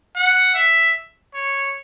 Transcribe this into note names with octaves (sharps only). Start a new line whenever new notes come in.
F#5
E5
C#5